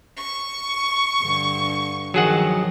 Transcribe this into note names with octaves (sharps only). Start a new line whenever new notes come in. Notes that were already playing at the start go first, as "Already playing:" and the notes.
C#6
G2 D3
D#3 F3 F#3 G#4 F#5